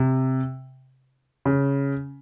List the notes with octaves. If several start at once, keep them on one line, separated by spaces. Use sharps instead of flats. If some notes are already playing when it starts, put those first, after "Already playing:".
Already playing: C3
C#3